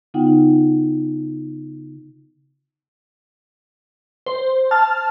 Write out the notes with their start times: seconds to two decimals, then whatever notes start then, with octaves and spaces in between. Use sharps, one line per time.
0.14 C#3 B3 D#4 F4 F#5 G5
4.26 C5
4.71 A5 F6